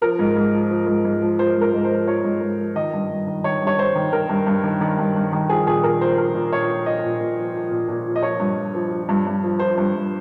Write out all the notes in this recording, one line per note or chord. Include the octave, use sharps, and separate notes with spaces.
F3 A#4
G#2
G#2
F3
F3
G#2
G#2
F3
F3 C5
G#2
A#4
G#2
C5
F3
F3 C#5
G#2
G#2
F3
D#3 D#5
G2
G2
D#3
D#3 C#5
G2
C#5
G2 C5
D#3
D#3 A#4
G2
G2
D#3
D#3
G2
G2
D#3
F3 G#4
A#2 G#4
A#2 A#4
F3 C5
F3 A#4
A#2
A#2 C#5
F3
F3 D#5
A#2
A#2
F3
F3
A#2
A#2
F3
D#5
F3 C#5
G2
G2
F3
F3
G2
G2
F3
F3 C5
G2
G2